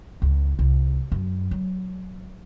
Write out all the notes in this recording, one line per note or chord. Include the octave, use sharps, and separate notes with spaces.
C#2
C2
F#2
F#3